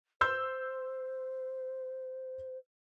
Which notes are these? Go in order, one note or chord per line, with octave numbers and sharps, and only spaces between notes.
C5 C6 E6 G6